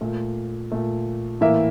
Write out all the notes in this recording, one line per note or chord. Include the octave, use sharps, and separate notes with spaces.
A#2 A3
A#2 A3
A2 E3 A#3 E5